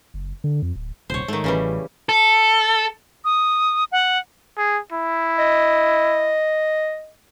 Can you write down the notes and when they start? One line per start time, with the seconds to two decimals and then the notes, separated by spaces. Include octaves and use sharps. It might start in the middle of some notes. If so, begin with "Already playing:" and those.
0.14 F#1
0.44 D3
0.62 F2
0.76 D1
1.10 D#1 C2 C5 C#5
1.28 G#2 D#3 A3
1.44 A1 C#3 E3 G3
2.09 A4
3.25 D#6
3.92 F#5
4.58 G#4
4.92 E4
5.38 D#5